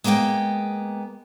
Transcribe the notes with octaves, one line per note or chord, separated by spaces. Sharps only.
G#3 A#3 B3 E5 G5